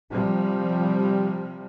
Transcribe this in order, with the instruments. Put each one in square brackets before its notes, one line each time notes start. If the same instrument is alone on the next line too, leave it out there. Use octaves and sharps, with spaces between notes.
[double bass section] C3 F3 G3